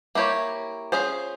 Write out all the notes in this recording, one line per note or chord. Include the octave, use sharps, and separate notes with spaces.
A#3 E4 G4 C#5
C#4 F4 G#4 C5